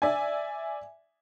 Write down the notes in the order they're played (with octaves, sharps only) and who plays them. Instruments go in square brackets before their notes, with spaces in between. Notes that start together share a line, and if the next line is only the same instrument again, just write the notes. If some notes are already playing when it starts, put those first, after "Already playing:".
[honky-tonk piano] D5 E5 G#5